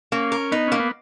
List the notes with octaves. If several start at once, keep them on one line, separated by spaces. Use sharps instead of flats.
A#3 C#4
A#4
B3 D#4
A#3 C#4
B3